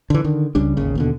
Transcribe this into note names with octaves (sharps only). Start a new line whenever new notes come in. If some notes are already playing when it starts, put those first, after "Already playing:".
D3 E3
D3 D#3
C#2 C#3 G3 D4
G#1 D#2 C#3
D#2 B2 D3